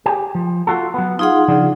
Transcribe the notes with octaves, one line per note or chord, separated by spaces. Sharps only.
G4 G#4
F3
F4 F#4 A4
F#3 B3
D#4 F4 G#4 F#5
C#3 F3 D4